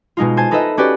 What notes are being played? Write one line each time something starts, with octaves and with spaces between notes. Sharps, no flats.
B2 G#3 D#4 F4
C5 G#5 A5 G#6
D#4 A4 B4 C5 D#5 E5
C#4 F#4 G4 B4 D5